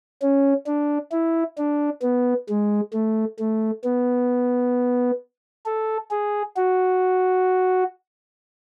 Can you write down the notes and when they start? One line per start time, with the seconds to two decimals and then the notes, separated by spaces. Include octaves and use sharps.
0.22 C#4
0.67 D4
1.12 E4
1.58 D4
2.02 B3
2.49 G#3
2.93 A3
3.39 A3
3.84 B3
5.66 A4
6.11 G#4
6.57 F#4